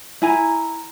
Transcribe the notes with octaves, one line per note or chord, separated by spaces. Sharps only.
E4 G#5 A#5